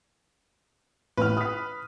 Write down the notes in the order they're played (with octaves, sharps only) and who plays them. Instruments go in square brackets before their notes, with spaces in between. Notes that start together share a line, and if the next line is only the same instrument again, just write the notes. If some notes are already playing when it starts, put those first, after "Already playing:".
[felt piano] A1 F6 [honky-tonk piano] B4
[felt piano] D#6 B6